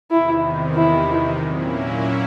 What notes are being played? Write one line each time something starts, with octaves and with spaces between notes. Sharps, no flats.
E2 C3 D#3 E4
E4
A#2 F#3 A#3 C#4 E4